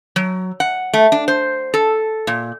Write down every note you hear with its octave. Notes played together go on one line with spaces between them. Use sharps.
F#3
F#5
A3
D4
C5
A4
A#2